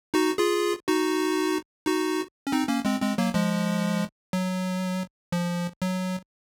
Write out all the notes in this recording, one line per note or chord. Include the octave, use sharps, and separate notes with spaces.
D#4 F#4
F4 G#4
D#4 F#4
D#4 F#4
C#4
C4 D#4
A#3 C#4
G#3 C4
G#3 C4
F#3 A#3
F3 G#3
F#3
F3
F#3